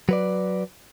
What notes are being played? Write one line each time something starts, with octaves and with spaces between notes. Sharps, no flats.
F#3 B4 D5